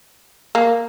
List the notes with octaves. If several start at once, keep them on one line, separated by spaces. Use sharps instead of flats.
A#3